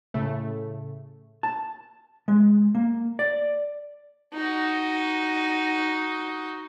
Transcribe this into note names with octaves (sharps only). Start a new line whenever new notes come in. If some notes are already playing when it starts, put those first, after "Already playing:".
A2 C#3 A3
A5
G#3
A#3
D5
D#4 F#4